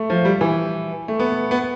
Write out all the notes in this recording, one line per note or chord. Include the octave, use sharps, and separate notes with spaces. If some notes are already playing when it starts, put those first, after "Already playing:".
Already playing: A3
F3
G3
E3
A3
B3
B3